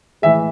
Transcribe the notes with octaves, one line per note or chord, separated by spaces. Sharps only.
A2 E3 G#3 E5